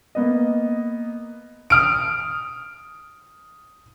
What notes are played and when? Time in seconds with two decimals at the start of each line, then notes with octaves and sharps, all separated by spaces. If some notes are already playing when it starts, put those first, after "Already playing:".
0.15 A#3 B3 D#5
1.70 D#6 F6 D7